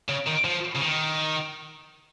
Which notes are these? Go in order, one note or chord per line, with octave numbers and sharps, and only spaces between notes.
C#3
D#3
F3
C#3
D#3